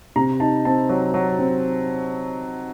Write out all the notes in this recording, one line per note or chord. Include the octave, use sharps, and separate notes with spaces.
C3 A#5
D#4 A5
C4 A5
F#3
F#3
C4